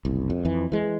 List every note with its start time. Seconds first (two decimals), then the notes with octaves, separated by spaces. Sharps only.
0.05 F#1 C2
0.30 F2
0.45 F2 E3
0.72 E3 G#3